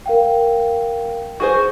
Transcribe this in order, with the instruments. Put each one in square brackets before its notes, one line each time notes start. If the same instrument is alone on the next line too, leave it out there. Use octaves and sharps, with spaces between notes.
[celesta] A#4 F5 G5
[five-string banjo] F#4 G#4 C5